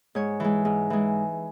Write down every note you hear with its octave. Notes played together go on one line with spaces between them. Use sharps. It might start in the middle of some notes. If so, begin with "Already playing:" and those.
G#2 C#5
E3 G#3
G#2
E3 G#3